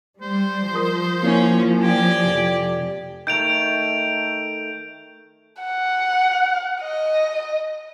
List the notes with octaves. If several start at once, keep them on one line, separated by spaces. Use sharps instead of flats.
G3 C5
F3 A#4 D#6
A#3 C4 C#4 E4 C#5
G4 D5 G#5
F1
D#3 A3 G6 D7 F7
F#5
D#5